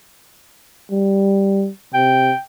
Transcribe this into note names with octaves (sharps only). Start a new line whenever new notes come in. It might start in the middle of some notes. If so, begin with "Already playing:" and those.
G3
C3 G5